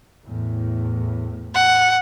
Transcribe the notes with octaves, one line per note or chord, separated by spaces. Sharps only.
E2 A2
F#5